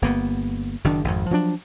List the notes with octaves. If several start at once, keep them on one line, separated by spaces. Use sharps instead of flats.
G1 A#3 B3
F#1 D#3 D4
G#1 F2
F3 F#3 C#4 D4